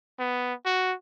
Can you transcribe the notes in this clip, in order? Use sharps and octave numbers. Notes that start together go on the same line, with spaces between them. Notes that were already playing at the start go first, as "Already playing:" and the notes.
B3
F#4